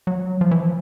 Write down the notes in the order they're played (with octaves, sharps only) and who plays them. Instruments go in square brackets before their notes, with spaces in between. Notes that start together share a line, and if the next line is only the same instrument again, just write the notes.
[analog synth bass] F#3
F3
E3
F3